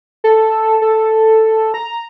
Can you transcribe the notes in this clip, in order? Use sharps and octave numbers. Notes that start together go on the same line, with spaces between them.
A4
A4
A#5